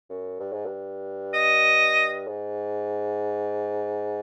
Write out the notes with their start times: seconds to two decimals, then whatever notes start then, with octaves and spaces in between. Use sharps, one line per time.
0.10 F#2
0.40 G2
0.52 G#2
0.66 G2
1.34 D#5
2.27 G#2